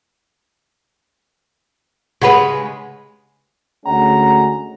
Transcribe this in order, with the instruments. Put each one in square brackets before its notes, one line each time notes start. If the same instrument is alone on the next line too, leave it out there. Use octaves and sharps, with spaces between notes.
[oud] C#3 G#3 B4 [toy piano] G4 F#5 B5
[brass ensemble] D2 G#3 C#4 F#5 A#5